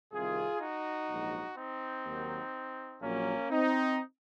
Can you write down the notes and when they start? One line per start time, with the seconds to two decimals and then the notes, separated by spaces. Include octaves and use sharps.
0.13 C2 C3 D#3 F4 G#4
0.61 D#4 F#4
1.09 A#1 G#2 F#3
1.57 C4 D#4
2.05 D#2 D#3 F#3
3.01 A#1 A#2 F#3 A#3 C#4
3.50 C4 D#4